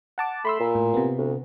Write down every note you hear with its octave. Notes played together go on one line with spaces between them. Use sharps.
F#5 A5 D6
A3 B5 C6 E6
A#2
A2
C3 B3
D2